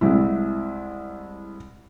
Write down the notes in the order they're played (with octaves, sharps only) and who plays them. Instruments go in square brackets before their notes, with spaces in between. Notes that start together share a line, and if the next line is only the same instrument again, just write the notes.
[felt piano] C2 G#3 E4